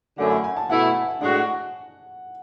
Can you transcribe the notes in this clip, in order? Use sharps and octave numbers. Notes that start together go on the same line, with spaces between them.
F#2 D3 A3 E4 F#5
F#5
G#5
A5
B2 A3 E4 F#5
A2 G#3 D4 F#4 F#5